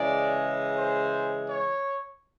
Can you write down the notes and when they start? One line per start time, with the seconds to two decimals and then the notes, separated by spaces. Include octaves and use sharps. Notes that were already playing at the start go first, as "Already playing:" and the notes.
Already playing: C#3 E3 G#3 D5
0.77 C5
1.47 C#5